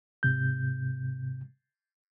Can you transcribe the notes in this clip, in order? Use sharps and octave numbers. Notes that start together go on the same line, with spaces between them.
G#2 C3 G6